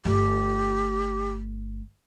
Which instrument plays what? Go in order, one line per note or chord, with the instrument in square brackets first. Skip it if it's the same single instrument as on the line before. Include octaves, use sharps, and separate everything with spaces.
[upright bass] G1 A3 [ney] G4